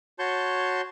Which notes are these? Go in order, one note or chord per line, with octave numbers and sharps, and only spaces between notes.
F#4 C#5 A5 C6 C#6 G6